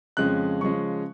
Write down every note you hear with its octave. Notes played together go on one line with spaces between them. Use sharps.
F2 C#3 F3 G#3 C#4 F#6
C#3 F3 G#3 C#4 C#6